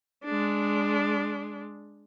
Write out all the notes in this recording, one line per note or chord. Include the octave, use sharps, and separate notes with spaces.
G#3 D4